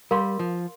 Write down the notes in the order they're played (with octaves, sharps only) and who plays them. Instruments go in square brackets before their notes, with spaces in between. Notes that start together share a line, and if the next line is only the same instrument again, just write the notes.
[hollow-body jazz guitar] G3 [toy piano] A#4 F5 C6
[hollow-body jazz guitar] F3